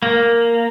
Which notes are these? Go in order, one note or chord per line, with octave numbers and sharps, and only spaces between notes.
A#3